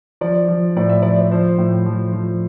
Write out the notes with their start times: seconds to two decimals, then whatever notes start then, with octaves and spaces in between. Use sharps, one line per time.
0.21 F3 D5
0.48 F3
0.76 A2 D5
0.89 E5
1.02 F3 D5
1.21 D5
1.31 F3 C5
1.58 A2
1.86 F3
2.13 F3